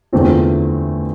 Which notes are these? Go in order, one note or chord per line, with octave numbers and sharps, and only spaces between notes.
E2 D3 A3 C4 F4